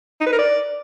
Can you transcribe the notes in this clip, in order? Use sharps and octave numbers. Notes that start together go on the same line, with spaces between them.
D#4
B4
A#4
D5